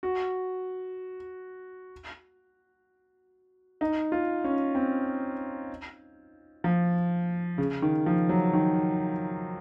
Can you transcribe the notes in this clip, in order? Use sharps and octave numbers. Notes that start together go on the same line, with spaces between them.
F#4
D#4
F4
C#4
C4
F3
C#3
D#3
F3
F#3
D#3